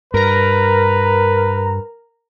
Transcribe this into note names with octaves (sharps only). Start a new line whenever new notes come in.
G2 A#4 B4 A#5